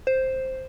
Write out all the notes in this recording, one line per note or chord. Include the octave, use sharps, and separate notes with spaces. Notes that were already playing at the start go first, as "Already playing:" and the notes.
C5